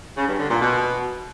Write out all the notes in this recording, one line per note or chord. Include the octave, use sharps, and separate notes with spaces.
C#3
G2
D3
A#2
B2